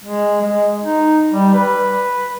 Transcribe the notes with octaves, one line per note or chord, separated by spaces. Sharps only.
G#3
G#3
D#4
G3
B4